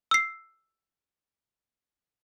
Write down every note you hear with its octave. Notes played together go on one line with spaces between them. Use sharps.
E6 C7